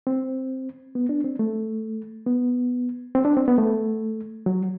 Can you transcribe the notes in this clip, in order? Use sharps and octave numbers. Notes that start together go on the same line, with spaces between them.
C4
B3
D4
C4
A3
B3
C4
D4
C4
B3
A3
F#3